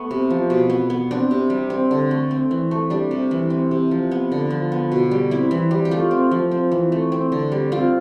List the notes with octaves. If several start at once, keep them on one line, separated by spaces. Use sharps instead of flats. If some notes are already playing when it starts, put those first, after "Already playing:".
Already playing: A3 B3
C3
F3
B2
B3
B3
C4 D4
C3
G3
C4
D3
A3
C4
E3
A3
G3 D4
C3
E3
C4
C3
F3
B3
D3
F3
B3
B2
G3
C4 E4
E3
G3
G4
A3 F4
C4
F3
C4
E3
A3
C4
D3
G3
C4 F4